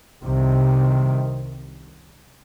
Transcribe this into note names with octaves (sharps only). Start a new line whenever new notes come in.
C2 C3 D#3